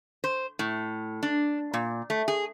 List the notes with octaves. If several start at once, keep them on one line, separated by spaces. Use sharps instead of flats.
C5
A2
D4
A#2
A3
G#4